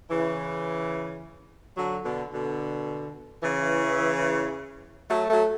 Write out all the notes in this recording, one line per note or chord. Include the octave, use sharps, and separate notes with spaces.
C#3 E3
D3 F#3
B2 D3
B2 D3
C#3 E3
F#3 A3
F#3 A3